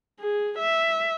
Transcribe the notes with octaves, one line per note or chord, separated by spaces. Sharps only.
G#4
E5